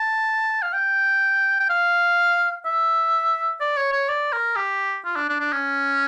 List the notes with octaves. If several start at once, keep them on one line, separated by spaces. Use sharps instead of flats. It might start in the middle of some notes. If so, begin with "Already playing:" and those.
Already playing: A5
F5
G5
G5
F5
E5
D5
C#5
C#5
D5
A#4
G4
F4
D4
D4
D4
C#4